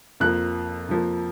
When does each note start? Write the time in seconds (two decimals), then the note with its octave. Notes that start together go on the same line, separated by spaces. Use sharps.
0.20 F2 F3 A#3 F#6
0.89 F2 F3 A#3